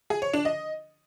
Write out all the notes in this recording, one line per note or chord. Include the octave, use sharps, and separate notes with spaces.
G#4
C#5
D4
D#5